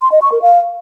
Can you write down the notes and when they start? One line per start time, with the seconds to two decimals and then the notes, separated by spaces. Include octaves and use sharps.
0.02 C6
0.12 D#5
0.22 C#6
0.32 A#4
0.42 F5